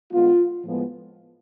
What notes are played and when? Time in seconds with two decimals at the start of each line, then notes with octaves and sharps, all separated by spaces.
0.11 D3 G#3 B3 F4
0.64 A2 F3 G#3 B3